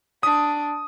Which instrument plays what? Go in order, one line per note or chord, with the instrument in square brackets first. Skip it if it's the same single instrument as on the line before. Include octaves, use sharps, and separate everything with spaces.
[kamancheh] D4 [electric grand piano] D#6